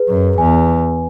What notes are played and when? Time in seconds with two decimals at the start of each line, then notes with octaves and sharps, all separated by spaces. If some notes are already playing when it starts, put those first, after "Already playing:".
Already playing: G#4 B4
0.08 F#2
0.38 E2 G#5